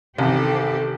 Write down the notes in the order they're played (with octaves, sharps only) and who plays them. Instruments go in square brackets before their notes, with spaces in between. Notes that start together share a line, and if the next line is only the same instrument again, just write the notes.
[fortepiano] A1 [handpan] C3 D#3 [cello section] C4 G4 A4